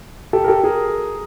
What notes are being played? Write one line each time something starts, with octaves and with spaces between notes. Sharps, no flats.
G4 A4
A#4
G4 A4
G#4 A#4